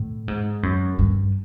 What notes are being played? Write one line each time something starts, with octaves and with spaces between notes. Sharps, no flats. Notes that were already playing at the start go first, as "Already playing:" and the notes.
Already playing: A2
G#2
F#2
G2